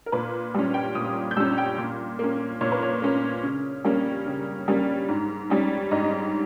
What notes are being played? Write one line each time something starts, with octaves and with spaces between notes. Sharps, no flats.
A#4
A#2 B4
G3 C#4
G5
A#2 D#6
G6
G3 C#4 E6
G5
A#2
A#3 C#4
A#2 C#5
B4
C#5
A#3 C#4
C#3
G3 A#3 C#4
C#3
G3 A#3 C#4
G#2
G3 C#4
G#2 D#5